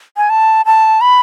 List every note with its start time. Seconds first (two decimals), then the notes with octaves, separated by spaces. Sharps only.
0.17 G#5
0.30 A5
0.66 A5
1.01 B5